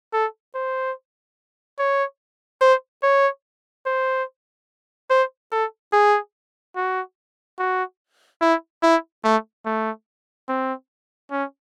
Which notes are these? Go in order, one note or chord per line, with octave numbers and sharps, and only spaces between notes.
A4
C5
C#5
C5
C#5
C5
C5
A4
G#4
F#4
F#4
E4
E4
A3
A3
C4
C#4